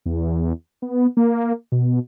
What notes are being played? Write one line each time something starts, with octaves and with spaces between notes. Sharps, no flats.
E2
B3
A#3
B2